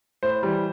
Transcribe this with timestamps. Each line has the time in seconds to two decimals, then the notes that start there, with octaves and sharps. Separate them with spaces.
0.23 A2 C5
0.43 E3 G3